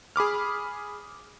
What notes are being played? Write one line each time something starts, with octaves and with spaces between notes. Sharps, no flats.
G#4 B5 D6 F6